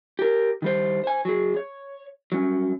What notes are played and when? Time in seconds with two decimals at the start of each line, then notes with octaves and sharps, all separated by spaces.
0.19 G4 A#4
0.62 D#3 G3 C5
1.04 C5 G#5
1.25 F#3 G#4
1.57 C#5
2.32 F#3 G3 C#4